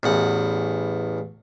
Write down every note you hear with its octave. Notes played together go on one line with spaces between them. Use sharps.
A1 E2 F#5